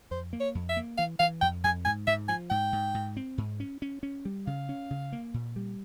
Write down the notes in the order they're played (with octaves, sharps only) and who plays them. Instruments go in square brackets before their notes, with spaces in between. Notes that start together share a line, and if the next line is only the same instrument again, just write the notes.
[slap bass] F2 [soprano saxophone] C5
[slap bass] A#3
[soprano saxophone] C#5
[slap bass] F2
[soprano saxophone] E5
[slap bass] A#3
[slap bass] E3 [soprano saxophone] F5
[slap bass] E3 [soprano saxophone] F5
[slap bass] F2 [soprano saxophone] G5
[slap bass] F2 [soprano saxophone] G#5
[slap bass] G#2 [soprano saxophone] G#5
[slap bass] G#2 [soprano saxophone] E5
[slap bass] F3 [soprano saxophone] G#5
[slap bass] G#2 [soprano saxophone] G5
[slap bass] G#2
G#2
C4
G#2
C#4
C#4
C#4
G3
[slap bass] C#3 [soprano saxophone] F5
[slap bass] C#4
C#3
A#3
A#2
G3